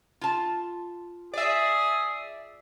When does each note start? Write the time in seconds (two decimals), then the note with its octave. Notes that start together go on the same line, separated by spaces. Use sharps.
0.21 F4 A5
1.34 G#4 D5 E5